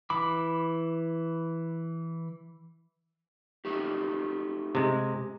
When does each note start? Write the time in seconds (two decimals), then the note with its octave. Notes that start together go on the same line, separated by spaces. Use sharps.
0.10 E3 B5 D6
3.65 A3 D#4 G4
4.75 C3 G#3